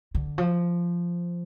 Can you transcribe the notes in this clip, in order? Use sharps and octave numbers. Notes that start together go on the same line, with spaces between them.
D3
F3